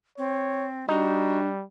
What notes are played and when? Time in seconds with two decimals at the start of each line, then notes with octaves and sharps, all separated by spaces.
0.18 C4 C#5
0.89 G3 D4 D#4 F#4